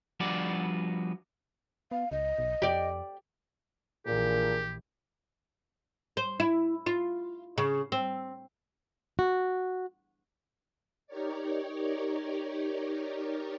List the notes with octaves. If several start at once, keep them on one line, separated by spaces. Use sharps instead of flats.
F3 G3 B3 D4 F#4 D5
B3 F5
C#2 D#5
B1
F2 G4 D5
A#1 A#2 E3 D4 G4 G#4 A#4
C5
E4
F4
C#3
C4
F#4
D#4 G4 A#4 C#5 D5